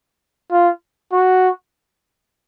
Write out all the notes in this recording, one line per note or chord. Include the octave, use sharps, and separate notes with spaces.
F4
F#4